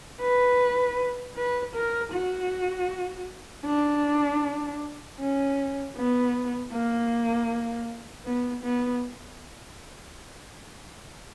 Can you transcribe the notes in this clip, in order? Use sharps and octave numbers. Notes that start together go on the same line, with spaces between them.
B4
B4
A#4
F#4
D4
C#4
B3
A#3
B3
B3